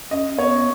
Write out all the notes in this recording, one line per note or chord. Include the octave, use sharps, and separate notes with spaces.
C#4 D#5
B3 C#5